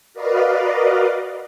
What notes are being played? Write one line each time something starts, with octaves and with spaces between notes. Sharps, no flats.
F#4 A#4 B4 D5 D#5 F5